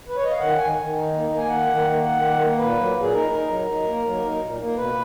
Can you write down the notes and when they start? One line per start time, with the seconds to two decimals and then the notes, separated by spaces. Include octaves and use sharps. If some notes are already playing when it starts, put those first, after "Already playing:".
0.08 B4
0.16 C#5
0.24 D#5
0.31 F5
0.39 D#3 F#5
0.58 D#3 G#5
0.76 D#3
0.94 D#4
1.12 A#3
1.30 A#3
1.37 G#5
1.48 D#3 F#5
1.67 D#3
1.85 A#3
2.03 D#3 F#5
2.21 A#3
2.40 A#3
2.57 A#2 B4
2.76 F#3
2.94 A#2
3.00 G#4
3.12 D#4 A#4
3.30 D#4
3.49 F#3
3.67 D#4
3.85 A#3
4.03 F#3
4.22 D#4
4.40 A#2
4.58 A#3
4.76 B2 B4